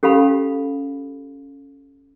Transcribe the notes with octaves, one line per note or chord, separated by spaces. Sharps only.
C#4 G4 A4 F5 B5